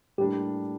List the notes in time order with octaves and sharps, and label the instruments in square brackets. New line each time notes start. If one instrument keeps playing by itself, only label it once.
[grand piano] A2 G3 A#3 D4 [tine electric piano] G4